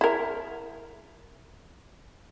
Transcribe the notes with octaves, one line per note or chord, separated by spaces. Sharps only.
E4 A#4